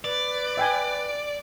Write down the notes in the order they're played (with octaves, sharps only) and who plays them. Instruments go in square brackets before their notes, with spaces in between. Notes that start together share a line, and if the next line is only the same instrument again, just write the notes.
[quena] B4 [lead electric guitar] D5
[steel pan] E5 G5 G#5